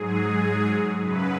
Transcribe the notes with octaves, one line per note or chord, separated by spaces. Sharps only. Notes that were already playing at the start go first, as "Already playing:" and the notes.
Already playing: G#2 F#3 G#4
F#2 C#3 F#3 B4